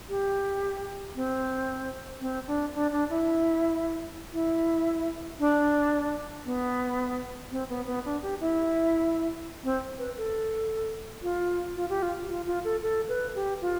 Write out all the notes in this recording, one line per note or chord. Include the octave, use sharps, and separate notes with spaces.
G4
C4
C4
D4
D4
D4
E4
E4
D4
B3
C4
B3
B3
D4
G4
E4
C4
B4
A4
F4
F4
G4
F4
F4
F4
A4
A4
B4
G4
F4